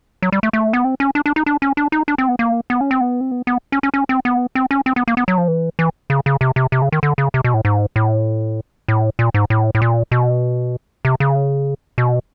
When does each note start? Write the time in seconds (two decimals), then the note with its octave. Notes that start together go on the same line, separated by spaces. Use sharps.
0.22 F#3
0.32 G3
0.43 A3
0.53 A3
0.73 B3
0.84 C4
1.00 C#4
1.15 D4
1.26 D4
1.36 D#4
1.46 D4
1.62 C#4
1.77 D4
1.92 D#4
2.08 D4
2.18 C4
2.28 B3
2.39 A#3
2.70 B3
2.81 C#4
2.91 C4
3.01 B3
3.21 C4
3.31 B3
3.47 B3
3.72 C#4
3.83 C#4
3.94 C#4
4.09 C4
4.25 B3
4.55 C4
4.71 C#4
4.86 C4
4.96 B3
5.08 A#3
5.17 B3
5.28 F#3
5.38 F3
5.48 E3
5.79 E3
6.10 C#3
6.26 C#3
6.41 C3
6.56 C3
6.72 C3
6.82 C#3
6.92 D#3
7.03 D3
7.18 C#3
7.34 C3
7.44 B2
7.54 A2
7.65 G#2
7.96 A2
8.88 A2
9.19 A#2
9.34 G#2
9.50 A2
9.75 A2
9.82 A#2
10.12 B2
11.05 C3
11.20 C#3
11.98 B2